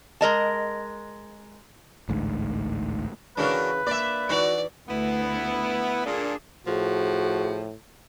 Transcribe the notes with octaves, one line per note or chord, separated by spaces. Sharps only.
G#3 A#4 D#5 A5
A1 D2 G#2
C#3 E3 D4 F#4 A#4 B4
A#3 D4 D5 E5
E3 D#4 F#4 D5
D2 B3 E4
A#2 D4 G#4 A4
A2 F3 F#4 G#4